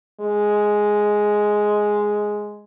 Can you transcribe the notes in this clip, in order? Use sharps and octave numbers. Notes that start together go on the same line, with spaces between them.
G#3